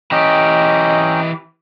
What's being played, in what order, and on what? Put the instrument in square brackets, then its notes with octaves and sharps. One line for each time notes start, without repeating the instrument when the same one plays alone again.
[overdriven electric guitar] E3 G4 [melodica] C#4 G5 A#5 [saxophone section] D#5